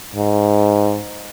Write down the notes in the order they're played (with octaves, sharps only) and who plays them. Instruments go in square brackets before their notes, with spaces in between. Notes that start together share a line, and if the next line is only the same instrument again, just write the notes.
[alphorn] G#2